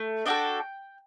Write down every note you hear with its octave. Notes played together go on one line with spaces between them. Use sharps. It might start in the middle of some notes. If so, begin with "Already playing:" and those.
Already playing: A3
D4 F#4 A4 D#5 G5